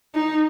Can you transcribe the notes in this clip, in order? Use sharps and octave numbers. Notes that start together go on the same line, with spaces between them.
D#4